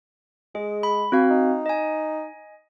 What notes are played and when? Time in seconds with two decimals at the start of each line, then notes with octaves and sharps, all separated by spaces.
0.55 G#3 G#4
0.83 B5
1.12 C4 F#4 F5
1.30 D#4
1.66 D#5 G#5